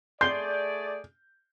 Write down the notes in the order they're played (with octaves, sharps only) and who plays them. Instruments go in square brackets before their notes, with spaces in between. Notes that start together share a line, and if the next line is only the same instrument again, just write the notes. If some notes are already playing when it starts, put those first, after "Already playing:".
[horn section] A3 G#4 D5 [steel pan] C6 [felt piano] G6